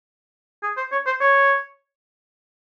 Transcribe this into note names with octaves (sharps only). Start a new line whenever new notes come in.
G#4
C5
C#5
C5
C#5